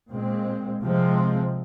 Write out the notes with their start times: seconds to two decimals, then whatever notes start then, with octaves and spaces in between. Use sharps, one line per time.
0.10 A#2 G#3 C4
0.82 C3 F3 G#3 C4